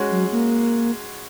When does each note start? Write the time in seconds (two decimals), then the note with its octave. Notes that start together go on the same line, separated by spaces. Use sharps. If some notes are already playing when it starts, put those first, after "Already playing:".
Already playing: G#3 C#4 F#4
0.11 F#3
0.32 A#3